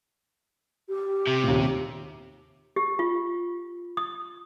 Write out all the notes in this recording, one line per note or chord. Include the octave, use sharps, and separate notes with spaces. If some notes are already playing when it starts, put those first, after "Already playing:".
G4
C3
D#2 A#2
G4
F4
D#6